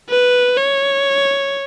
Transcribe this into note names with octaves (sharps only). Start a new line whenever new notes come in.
B4
C#5